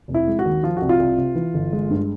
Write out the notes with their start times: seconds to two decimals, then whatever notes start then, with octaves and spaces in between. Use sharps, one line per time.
0.08 F1
0.14 E4
0.27 G#3
0.39 F#4
0.45 D#2
0.63 F3 F4
0.77 C2 F#4
0.89 F4
1.00 C2
1.18 C3
1.35 E3
1.54 G1
1.73 G#3
1.91 G2